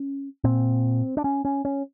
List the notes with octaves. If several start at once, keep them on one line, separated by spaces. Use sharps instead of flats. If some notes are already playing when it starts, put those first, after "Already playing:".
Already playing: C#4
A#2 C4
D4
C#4
C#4
C#4